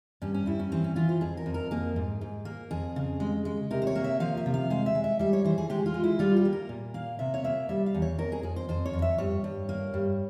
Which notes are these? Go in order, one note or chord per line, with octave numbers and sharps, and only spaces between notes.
G2 C#4
C#4
G2 E4
C#4
E3 C4
C#4
E3 F4
C5
F2 G#4
A#4
F2
A#4
A#3 G#4
G#2
G#2
A#3
F2 G#4
C#3
G#3
G#3
C3 A#4
C5
C#5
A#3
E5
F3 F5
E5
C3
F5
G#3 F5
E5
G#3
E5
G3 E5
C#5
E3 C5
G#4
G#3 G4
F4
G#3
E4
G3 F4
G4
A#3
A#4
A#2
A#3 F5
C3 E5
C#5
A#3 E5
G3 E5
F5
E2
C#5
F2 A#4
G#4
F2 G#4
C5
F2 C5
C#5
F2
E5
G2 C#5
G2
A#3
G2